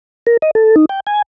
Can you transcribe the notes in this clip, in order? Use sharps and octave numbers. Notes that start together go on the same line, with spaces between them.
A#4
D#5
A4
D#4
G5
G#5